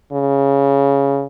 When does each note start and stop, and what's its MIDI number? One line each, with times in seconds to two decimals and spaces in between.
0.12 1.25 49